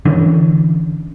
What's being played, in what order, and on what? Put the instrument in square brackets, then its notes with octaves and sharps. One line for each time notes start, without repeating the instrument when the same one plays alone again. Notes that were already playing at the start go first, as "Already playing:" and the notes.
[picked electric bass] D3 E3 B3 C#4